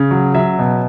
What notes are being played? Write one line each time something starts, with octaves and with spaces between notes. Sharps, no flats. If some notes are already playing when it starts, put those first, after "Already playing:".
Already playing: C#3
F#3
F#3 E5
B2